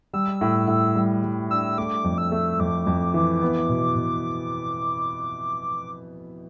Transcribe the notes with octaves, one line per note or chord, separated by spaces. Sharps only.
G3 E6
A2
A2
G3
G3
D4 E6
A3 D6
F2
E6
A3
F2 D6
F2
E3
B3
B2
B2